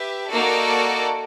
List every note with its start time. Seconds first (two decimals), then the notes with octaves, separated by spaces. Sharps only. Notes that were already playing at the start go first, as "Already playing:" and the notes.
Already playing: G4 B4 E5
0.31 A#3 D#4 F#4 A4 D5